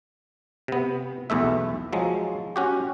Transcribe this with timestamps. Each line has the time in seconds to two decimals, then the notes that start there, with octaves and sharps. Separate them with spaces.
0.68 C3 B3
1.30 B1 E2 A3 E5
1.93 F3 F#3 G#3
2.56 C#4 F#4 G4